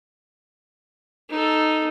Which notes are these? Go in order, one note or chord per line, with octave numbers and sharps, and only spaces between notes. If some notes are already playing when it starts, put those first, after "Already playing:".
D#4 A4